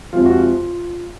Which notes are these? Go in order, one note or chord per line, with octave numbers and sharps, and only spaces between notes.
F2 C3 F3 G#3 F4
F#4
F4